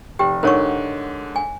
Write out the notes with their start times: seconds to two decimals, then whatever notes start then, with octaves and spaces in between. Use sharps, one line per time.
0.19 F1 G4 G5
0.43 G#2 D3 A#4 C#5 C#6
1.36 G#5